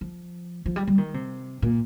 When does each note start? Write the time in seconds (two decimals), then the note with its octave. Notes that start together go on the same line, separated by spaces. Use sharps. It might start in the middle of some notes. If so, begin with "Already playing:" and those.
0.01 F3
0.66 F3
0.76 G3
0.87 G3
0.98 D#3
1.14 C3
1.62 A#2